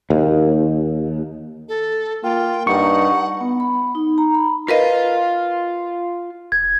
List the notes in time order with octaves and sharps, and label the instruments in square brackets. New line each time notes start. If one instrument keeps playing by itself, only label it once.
[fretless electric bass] D#2
[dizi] A4
[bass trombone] A#3 [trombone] F4 [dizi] G5
[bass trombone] G2 [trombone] D#4 [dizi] F#5 [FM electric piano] C#6
[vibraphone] B3
B5
D#4
A#5
B5
[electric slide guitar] F4 F5 [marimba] A#4 B4 D#5
[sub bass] E1 [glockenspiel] G#6